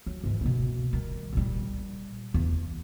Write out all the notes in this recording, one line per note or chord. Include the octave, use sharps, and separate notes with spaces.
F#3
G#2 E3
B2 A#3
D#3 G3
A#2 G3
E2